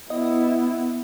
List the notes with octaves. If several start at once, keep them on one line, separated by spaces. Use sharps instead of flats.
B3 E4 D#5